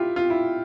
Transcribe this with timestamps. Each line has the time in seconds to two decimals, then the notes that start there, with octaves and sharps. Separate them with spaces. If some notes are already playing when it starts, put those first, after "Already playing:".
Already playing: E4 F4 G4
0.16 F4
0.30 E4